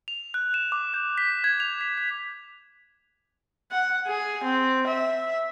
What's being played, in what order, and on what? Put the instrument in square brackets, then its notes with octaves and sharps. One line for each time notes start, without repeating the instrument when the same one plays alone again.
[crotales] F7
F#6
E7
D6
G6
B6
G#6
F7
B6
B6
[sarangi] F#5
G#4
C4
E5